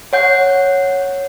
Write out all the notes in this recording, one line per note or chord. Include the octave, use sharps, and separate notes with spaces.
C#5 F#5 G6